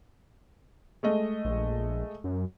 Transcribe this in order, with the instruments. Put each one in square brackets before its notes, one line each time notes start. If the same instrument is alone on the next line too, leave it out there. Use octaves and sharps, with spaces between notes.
[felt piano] G#3 A3 D#5
[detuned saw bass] A#1
F#2